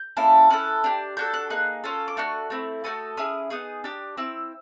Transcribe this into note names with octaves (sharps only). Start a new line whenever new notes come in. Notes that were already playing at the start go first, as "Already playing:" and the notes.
Already playing: G6
A#3 C#4 E4 A4
C#4 E4 A4 F#6
D4 G4
D4 F#4 A4 G6
F#6
A#3 D#4 G#4 F#6
C#4 F4 A4
D6
A3 D4 F#4 C#6
A3 C4 E4
A3 C#4 F#4 A4 D#6
C#4 E4 G#4 D#6
B3 D#4 G#4 D#6
D4 G4
C4 E4 E6